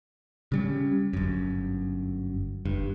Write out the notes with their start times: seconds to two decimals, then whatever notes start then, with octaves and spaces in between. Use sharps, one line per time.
0.52 C#3 G3 C#4
1.13 G1 F#2
2.65 F#1 G2